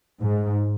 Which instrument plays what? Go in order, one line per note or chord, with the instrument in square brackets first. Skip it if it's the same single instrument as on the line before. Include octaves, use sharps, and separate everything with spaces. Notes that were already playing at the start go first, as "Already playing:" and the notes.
[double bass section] G#2